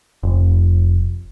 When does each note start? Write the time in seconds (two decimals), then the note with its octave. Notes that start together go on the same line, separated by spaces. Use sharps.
0.23 F1